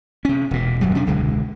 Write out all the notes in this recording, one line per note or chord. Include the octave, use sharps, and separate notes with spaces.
C3 C#4
E1 A#2
D1 F#2 F#3 G3
C3 C#4 D4
E1 C#2 D3 G#3